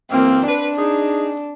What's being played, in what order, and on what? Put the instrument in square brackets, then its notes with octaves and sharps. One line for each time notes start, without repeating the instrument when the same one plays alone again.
[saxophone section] F#2 E3 A#3 [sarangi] C4
[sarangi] D4 [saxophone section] B4
[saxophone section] D#4 G#4